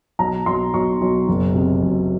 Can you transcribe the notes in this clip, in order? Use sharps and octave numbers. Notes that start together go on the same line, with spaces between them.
B1 A#5
B1 C6
B1 C#6
B1
F#1
C3
F#1